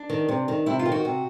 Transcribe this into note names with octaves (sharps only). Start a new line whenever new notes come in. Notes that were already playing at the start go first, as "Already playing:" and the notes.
Already playing: D4
D#3
C3
D#3
C3 E4
F4
D#3
F#4
C3